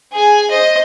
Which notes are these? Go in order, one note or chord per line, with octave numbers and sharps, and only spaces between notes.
G#4 G#5
C5 D#5